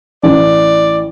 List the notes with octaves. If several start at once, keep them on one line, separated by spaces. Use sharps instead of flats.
A1 D5